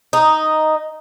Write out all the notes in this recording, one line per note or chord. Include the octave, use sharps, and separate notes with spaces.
D#4